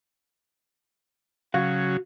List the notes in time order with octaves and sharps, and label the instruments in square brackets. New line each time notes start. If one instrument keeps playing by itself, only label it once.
[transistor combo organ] C#3 F#3 [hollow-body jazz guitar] F#4 F5